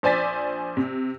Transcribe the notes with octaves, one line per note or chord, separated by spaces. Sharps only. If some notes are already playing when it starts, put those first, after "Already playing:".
A#1 C5 D5 G#5 A6 B6
C3